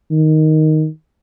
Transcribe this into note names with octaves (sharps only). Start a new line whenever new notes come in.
D#3